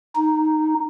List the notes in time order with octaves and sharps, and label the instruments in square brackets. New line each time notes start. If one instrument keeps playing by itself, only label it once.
[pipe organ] D#4